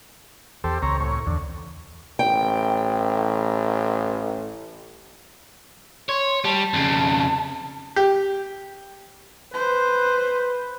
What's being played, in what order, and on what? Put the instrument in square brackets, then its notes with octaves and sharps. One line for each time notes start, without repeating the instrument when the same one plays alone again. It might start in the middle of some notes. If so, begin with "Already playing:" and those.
[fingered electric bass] E2 [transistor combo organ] G4 A4 C5
[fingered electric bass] C#2 [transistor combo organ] C4 C#5 A#5
[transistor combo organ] A2 C#5
[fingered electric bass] E2 E3 [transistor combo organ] D3
[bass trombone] A1 [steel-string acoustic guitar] G5
[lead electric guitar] C#5 [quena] C6
[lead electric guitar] G3 [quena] A5
[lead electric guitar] F2 C#3
[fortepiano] G4
[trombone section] B4 [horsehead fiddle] C5